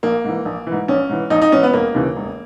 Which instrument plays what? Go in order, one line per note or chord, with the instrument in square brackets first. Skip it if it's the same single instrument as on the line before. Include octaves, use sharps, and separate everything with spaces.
[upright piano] A#1 A#3
G#2 E3
A#1
E3
G#2
A#1 C#4
G#2 E3
A#1 D#4
D#4
G#2 E3 C#4
B3
E1 A#3
D#2 C#3 E3
E1